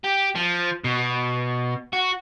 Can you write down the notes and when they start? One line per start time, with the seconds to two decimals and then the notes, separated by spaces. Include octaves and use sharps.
0.04 G4
0.35 F3
0.84 B2
1.93 F#4